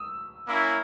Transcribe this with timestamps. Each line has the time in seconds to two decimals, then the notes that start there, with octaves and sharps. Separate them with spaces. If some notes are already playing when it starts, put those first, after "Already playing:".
Already playing: D#6 E6
0.47 A#3 C#4 E4